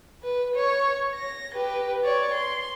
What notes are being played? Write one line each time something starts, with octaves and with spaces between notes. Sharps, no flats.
B4
C#5
A#6
G4 B4
C#5 D5
C6